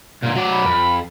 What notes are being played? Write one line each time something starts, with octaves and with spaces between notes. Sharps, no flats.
A#2 D3
F#3 D5
B5
F2